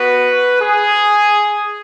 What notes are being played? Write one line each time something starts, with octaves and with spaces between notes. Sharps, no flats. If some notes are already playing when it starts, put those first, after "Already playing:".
Already playing: B3 F#4 B4
G#4